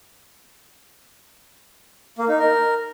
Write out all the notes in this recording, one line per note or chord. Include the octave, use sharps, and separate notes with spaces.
A#3
D#4
A#4